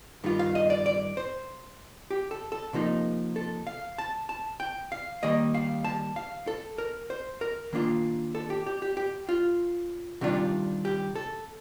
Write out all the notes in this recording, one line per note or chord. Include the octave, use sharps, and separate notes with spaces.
G2 D#3 F4
F5
D#5
D5
D5
C5
G4
A4
A4
C3 F3 A#3 D#4
A4
F5
A5
A5
G5
F5
D#3 G3 A#3 D#5
F5
A5
F5
A4
A#4
C5
A#4
D#3 A#3 D4 F4
A4
G4
G4
G4
G4
F4
C3 D#3 G3 D4 F4
G4
A4